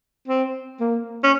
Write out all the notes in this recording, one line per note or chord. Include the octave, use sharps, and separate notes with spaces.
C4
A#3
C#4